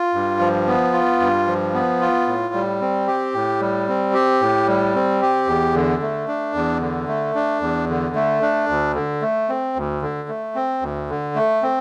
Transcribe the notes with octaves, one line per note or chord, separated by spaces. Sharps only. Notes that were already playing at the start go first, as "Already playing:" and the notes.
Already playing: F4
G2
F3
B3
F4
G2
F3
B3
F4
A2
G3
C4
G4
A2
G3
C4
G4
A2
G3
C4
G4
E2
D3
A3
D4
E2
D3
A3
D4
E2
D3
A3
D4
D2
D3
A3
C4
D2
D3
A3
C4
D2
D3
A3
C4